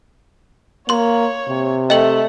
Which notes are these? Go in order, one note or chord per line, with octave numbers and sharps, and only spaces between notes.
A#3 C#5 C6 F#7
C3
A3 D#5 G5 F#7